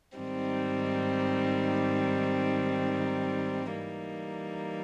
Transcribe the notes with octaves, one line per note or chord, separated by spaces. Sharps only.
G#2 D#3 G3 C4 D#4
E3 G3 A#3 D#4